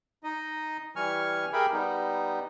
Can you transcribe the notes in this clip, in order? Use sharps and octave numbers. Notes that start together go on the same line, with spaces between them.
D#4 D#5
E3 G3 G#5 C#6 F6
G4 G#4 A#4 E5 G5 B5
G3 B3 D#4